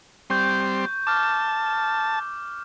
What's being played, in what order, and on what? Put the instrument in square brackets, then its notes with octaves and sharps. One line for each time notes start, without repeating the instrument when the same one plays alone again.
[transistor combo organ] G3 C4 C6 [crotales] C#6 G6
[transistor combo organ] A5 [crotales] D6 F6